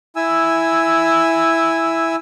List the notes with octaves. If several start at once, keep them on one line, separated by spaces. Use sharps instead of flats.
E4 G#5 E6